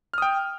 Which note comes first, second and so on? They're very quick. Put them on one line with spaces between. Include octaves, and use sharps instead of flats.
F6 D#6 G5